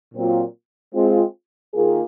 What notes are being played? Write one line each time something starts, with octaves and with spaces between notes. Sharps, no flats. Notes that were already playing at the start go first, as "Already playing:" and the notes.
A#2 F#3 C4 F4
G#3 C4 F4
D#3 A#3 F4 G#4